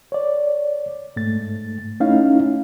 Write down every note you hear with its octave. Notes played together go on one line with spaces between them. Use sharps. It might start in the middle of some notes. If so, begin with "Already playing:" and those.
C#5 D5
G#2 A3 A6
A3 C#4 D#4 E4 F5